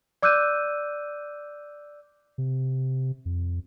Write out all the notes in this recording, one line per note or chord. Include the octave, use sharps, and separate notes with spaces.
D5 D6 E6 F#6 G6 D#7
C3
F2